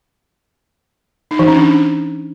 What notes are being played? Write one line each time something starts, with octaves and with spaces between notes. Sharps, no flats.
D#4
E3
C#4
D4